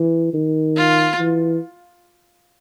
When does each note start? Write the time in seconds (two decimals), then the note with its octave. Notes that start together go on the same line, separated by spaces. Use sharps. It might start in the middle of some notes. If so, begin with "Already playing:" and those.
Already playing: E3
0.33 D#3
0.77 F4
1.19 E3